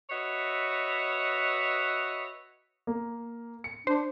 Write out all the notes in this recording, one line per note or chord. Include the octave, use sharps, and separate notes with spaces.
F#4 B4 C#5 D#5 E5
A#3
C#7
D4 C5